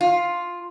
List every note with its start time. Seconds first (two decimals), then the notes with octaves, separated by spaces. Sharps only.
0.01 F4